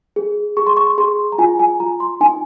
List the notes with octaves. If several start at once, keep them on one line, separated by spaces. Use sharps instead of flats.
G#4
G#4 C#6
C6
C#6
G#4 C6
A#5
F4 G#5
G#5
F4 A#5
C6
D#4 G#5